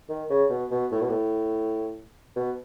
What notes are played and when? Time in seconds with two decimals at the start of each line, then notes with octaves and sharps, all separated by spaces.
0.09 D#3
0.30 C#3
0.50 B2
0.71 B2
0.92 A2
1.02 B2
1.10 A2
2.36 B2